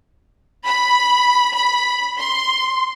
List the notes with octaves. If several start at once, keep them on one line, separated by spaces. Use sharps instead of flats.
B5
B5
C6